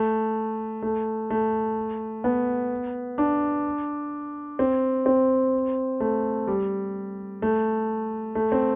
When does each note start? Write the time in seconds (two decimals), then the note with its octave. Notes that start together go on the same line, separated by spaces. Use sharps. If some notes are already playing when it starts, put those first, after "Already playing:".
Already playing: A3
0.83 A3
1.30 A3
2.24 B3
3.18 D4
4.59 C4
5.06 C4
6.00 A3
6.47 G3
7.42 A3
8.35 A3
8.52 C4